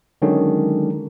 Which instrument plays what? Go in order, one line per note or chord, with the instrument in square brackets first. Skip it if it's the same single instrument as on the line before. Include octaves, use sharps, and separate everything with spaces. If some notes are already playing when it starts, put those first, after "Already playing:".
[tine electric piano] D3 D#3 F#3 G#3 C#4 D4